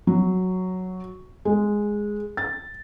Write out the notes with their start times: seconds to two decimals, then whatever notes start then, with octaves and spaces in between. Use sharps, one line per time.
0.07 F#3
1.45 G#3
2.37 A6